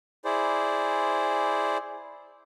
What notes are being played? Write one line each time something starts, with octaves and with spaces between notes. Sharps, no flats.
E4 G#4 C5 D5